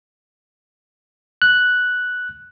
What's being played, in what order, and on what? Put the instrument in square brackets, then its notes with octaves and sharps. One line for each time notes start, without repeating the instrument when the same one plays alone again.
[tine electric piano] F#6